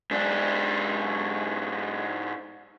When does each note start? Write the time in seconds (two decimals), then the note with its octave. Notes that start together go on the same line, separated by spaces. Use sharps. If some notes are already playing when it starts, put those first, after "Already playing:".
0.11 G#2 D4